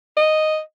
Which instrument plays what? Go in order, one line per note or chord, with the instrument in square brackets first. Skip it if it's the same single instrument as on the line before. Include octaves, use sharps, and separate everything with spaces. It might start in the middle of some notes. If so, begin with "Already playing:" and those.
[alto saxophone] D#5